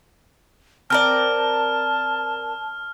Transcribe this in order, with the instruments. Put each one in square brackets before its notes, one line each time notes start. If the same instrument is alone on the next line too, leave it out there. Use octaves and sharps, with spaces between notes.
[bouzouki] C4 A#4 D5 [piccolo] A5 [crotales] F6